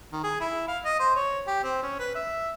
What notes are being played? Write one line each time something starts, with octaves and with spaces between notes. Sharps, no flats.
D#3
G#4
E4
F5
D#5
C5
C#5
G4
C4
C#4
B4
E5